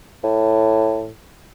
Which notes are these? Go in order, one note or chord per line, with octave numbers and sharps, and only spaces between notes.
A2